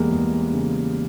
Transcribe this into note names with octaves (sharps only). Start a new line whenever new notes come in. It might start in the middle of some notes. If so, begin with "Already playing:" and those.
Already playing: E2 E3 G3 G#3 A#3
E2 G#3
C#3